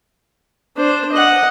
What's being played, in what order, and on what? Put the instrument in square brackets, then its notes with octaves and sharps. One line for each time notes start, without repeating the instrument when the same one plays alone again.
[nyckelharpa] D4 C5
D#5 F#5